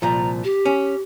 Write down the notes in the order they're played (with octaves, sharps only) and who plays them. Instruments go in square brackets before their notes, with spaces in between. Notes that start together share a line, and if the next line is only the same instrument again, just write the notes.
[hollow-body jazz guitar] C2 A#2 F3 [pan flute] A#5
[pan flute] G4
[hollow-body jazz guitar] C#4